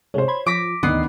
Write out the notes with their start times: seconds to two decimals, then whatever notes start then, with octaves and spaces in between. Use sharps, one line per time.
0.14 C3 G#3 A3 C5 C#5
0.28 B5 C6 G#6
0.46 F3 D6 A#6 B6
0.83 D2 D3 D#3 B3 D#5 C7